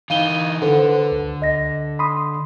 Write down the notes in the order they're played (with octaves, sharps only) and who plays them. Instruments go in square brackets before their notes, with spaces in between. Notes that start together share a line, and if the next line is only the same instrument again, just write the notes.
[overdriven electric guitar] E3 D#4 [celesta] F5 D#7 G7
[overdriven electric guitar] D3 [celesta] A4 [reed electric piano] B4 C5 F#5
[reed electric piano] D2
[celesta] D#5 A#6
[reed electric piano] B5 C6 D#6